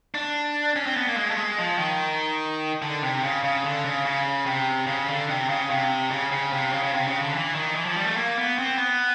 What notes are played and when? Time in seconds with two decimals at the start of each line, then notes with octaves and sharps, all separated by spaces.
0.15 D4
0.76 C#4
0.86 C4
0.97 B3
1.07 A#3
1.17 G#3
1.31 A3
1.38 G#3
1.58 F3
1.78 D#3
2.82 D3
3.02 C3
3.23 C#3
3.44 C#3
3.64 D3
3.84 C#3
4.05 C#3
4.46 C3
4.87 C#3
5.08 D3
5.29 C3
5.49 C#3
5.70 C3
6.11 C#3
6.32 C#3
6.53 C3
6.72 C#3
6.83 C#3
6.93 C3
7.07 C#3
7.21 D3
7.34 E3
7.55 D#3
7.76 E3
7.86 F3
7.96 G3
8.07 A3
8.17 A#3
8.37 B3
8.59 C4
8.78 B3